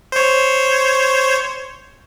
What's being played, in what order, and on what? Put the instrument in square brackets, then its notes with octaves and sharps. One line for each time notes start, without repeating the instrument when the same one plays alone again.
[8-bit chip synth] C5 C#5